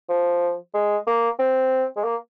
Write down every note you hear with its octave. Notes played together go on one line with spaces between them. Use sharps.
F3
G#3
A#3
C4
G#3
A#3